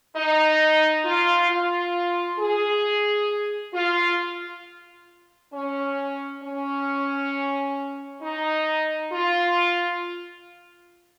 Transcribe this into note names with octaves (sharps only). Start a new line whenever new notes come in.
D#4
F4
F4
G#4
F4
C#4
C#4
D#4
F4